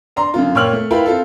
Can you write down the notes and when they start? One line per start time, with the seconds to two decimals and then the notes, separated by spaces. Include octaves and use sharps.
0.16 D4 A#5 C6
0.34 F#2 D3 F4
0.55 A#2 C#5 G5 F6 F#7
0.73 A3
0.91 E4 F4 A#4 B4 G5 B5
1.06 C4 F4 A4